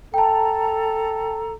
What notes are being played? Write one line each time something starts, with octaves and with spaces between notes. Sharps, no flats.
A4 G5 A5 A#5